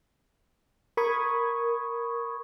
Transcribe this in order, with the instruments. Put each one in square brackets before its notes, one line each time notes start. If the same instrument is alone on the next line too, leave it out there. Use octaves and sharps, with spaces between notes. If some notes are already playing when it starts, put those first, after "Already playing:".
[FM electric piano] A#4 B5 C#6 D#6 G#6